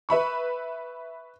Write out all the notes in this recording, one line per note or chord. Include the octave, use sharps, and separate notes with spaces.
B4 E5 B5 C#6